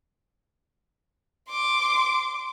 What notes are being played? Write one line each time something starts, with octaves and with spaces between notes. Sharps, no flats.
C6 D6